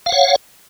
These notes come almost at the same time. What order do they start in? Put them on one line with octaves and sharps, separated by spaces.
F5 F#5 C#5